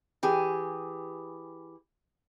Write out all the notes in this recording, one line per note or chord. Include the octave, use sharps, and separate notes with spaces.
E3 G4 G#4